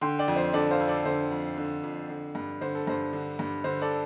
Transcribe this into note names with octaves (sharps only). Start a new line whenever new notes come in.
D3 G5 C6
D5 G5
F2
C5
D3 A4 D5
C5 F5
F2
A4 D5
D3 C5
F2
D3
F2
D3
G2
D3 C5
A4
G2 C5
D3
G2
D3 C5
A4 D5